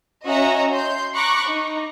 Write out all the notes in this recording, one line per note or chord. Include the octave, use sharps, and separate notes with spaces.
C#4 F#4 D#5 E5 A#5
C6 G6
A#5 B5 C#6 D6 F#6
D#4